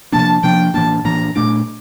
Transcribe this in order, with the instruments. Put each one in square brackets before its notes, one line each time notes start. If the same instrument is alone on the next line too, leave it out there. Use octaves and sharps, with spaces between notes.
[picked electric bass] C3 F3 A#3 D4 [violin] A5
[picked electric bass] C3 F3 A#3 D4 [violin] G5
[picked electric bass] A2 E3 A#3 D4 [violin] A5
[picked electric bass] A2 E3 A#3 D4 [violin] A#5
[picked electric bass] A#2 A3 D4 [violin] D6